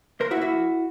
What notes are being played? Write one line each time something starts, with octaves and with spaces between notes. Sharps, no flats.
A#3 A#4 C5
E4 F#4
A#3
E4 F#4
F2